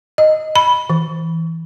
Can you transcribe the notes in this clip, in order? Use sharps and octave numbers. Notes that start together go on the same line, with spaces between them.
D#5
B5
E3